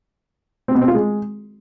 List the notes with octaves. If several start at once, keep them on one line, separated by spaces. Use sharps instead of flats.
C4
B2
C4
F4
G#3